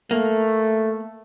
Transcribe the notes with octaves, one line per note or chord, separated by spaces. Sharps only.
A3 A#3